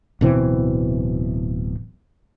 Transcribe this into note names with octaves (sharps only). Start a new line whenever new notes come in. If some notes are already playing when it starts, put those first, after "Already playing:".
D1 B2 E3 C4